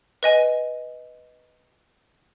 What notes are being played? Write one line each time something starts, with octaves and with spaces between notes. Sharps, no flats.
B4 D#5 G#5